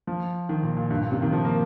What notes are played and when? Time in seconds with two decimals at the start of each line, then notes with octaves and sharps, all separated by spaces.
0.07 F3
0.49 D#3
0.63 A#2
0.77 A#2
0.90 G2
1.01 A#2
1.12 C3
1.22 D#3
1.33 F3
1.45 A#3